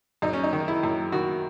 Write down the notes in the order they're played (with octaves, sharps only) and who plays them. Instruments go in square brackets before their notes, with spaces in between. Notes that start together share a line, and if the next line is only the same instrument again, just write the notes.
[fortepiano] F#2 D#4
C#4
D#4
D#3
E4
F#2
D#3 F#4